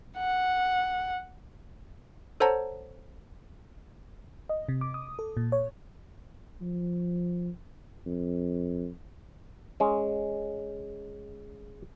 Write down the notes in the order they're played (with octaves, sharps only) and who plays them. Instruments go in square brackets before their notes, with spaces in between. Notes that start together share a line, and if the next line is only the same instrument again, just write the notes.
[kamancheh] F#5
[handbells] A4 C5 C#5 F#5 A5 A#5
[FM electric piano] D#5
C3
D6
D#6
A4
A#2
C#5
[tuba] F3
F2
[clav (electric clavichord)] G#3 C#4